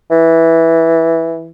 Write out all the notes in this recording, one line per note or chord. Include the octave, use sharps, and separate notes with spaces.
E3